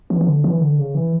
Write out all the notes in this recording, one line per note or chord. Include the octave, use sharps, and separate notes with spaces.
E3
E3
D3
E3
D3
C#3
E3